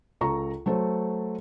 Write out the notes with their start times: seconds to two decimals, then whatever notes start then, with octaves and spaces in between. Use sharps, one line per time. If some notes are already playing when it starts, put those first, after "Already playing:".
0.21 C#2 A4 A#5 C#6
0.66 F#3 A3 A4 C5